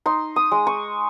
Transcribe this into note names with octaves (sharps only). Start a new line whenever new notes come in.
D#4 C6
D#6
G#3
C#6